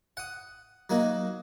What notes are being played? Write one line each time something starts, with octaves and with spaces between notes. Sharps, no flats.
F#5 D#6
F#3 A#3 D#4 F#4